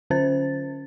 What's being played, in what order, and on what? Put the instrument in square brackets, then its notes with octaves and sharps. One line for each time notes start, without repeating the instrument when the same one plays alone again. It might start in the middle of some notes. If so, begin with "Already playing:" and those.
[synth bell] D3 C#4 C5 A6